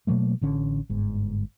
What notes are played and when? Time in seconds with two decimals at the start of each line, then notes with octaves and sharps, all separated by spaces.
0.07 B2 F#3 A3 A#3
0.41 A1 D3 C#4
0.89 G1 G#2